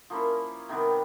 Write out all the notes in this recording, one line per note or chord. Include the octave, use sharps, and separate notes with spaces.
F3 A#3 C#4 E4
C3 D#3 G3 B3